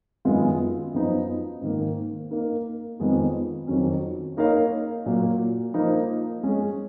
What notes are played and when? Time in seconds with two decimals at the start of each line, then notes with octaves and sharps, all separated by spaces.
0.25 F#2 D#3 G#3 B3 F4
0.93 F#2 F3 B3 D#4
1.61 G#2 D#3 A#3
2.31 A#3 D#4 A#4
3.00 F2 D#3 G#3 B3 F4
3.67 F2 D#3 F#3 C#4
4.37 A#3 D#4 A#4 C#5 F5
5.06 A#2 F#3 A#3
5.74 F3 A#3 D#4
6.43 G#3 C#4 G#4